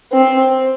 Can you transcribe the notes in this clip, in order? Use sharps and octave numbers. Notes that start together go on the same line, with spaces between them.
C4